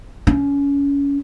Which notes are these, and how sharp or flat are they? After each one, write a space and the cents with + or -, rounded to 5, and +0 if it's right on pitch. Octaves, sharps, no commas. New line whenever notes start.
C#4 +25